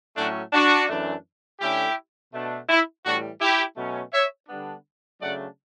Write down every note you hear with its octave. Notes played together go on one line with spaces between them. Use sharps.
A2 F#3 A3 C#4 D4 F#4
D4 F#4
F#2 E3 A3 D4
D3 A3 C#4 E4 G4
B2 A3 D4
E4
A2 E3 G3 D4 F#4
E4 G4
B2 F#3 A3 C#4
C#5 E5
D3 G3 B3 D4
C#3 F#3 A3 D4 D5 F#5